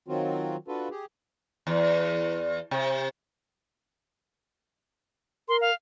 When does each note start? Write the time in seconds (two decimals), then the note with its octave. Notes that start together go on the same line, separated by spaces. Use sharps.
0.08 D#3 F#3 C4 F4 F#4
0.68 D4 F4 F#4 A4 B4
0.91 G4 G#4
1.67 E2
2.71 C3
5.49 A#4 C6
5.61 F5